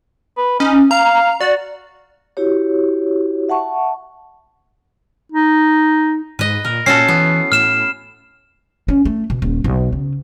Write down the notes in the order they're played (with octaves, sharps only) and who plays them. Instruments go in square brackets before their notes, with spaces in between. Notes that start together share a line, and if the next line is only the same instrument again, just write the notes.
[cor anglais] B4
[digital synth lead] C#4 [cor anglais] D#4
[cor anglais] F5 [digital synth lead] A#5
[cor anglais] F#4 [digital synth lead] D5
[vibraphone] E4 F#4 G4 C#5
E5 F#5 A5 C#6
[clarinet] D#4
[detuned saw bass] G#2 [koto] B4 D#5
[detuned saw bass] A#2 [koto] A#4
[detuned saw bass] A#2 [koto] C#4 F#4 A4 [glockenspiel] C7
[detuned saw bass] E3 [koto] B3
[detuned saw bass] A2 [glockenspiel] F6 E7
[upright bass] C#4
A3
B2
D#1
B1
C#3